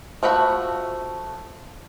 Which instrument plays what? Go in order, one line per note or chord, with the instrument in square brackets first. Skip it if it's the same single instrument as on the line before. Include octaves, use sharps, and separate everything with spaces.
[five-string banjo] F3 A3 F#4 B5